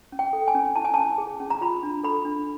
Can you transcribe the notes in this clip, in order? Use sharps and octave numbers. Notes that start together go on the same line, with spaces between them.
C#4
G5
A4
G#5
C#4
E4 A5
G#5
A5
C#4
G#4
C#4
A#5
F4 B5
D4
A4 B5
D4